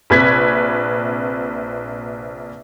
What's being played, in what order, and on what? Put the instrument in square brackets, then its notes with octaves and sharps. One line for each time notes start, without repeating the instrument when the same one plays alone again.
[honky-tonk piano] A#1 C3 B4 G#6 B6